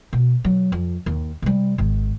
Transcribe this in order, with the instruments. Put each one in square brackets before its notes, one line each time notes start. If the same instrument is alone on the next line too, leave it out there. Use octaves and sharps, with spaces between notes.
[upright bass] B2
F#3
F2
D#2
C3 G3
G#1 D#3